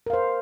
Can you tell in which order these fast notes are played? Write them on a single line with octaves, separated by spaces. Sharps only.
A#4 F5 C5